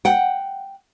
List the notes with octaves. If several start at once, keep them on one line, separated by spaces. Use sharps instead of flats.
F#5 G5